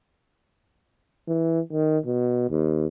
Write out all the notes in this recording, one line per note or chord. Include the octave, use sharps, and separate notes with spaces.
E3
D#3
B2
D#2